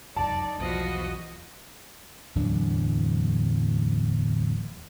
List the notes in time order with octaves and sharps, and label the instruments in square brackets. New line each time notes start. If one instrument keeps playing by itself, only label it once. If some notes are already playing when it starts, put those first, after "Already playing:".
[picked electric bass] F1 C#2 F#2 [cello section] D#4 D5 [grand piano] A5
[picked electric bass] B1 E2 [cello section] F3 G3 B3 [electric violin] F#4 D#5
[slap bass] D1 E2 F#3 D4